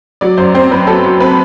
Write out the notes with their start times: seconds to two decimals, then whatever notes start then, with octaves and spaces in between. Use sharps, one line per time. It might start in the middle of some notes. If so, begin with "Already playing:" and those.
0.21 F#3 D5
0.37 F#2 C5
0.54 C4 C5
0.71 F#2 B4
0.87 F#3 A4
1.04 F#3
1.20 C4 B4